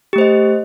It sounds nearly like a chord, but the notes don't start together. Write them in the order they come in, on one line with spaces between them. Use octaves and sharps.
G4 A3 C5 D#5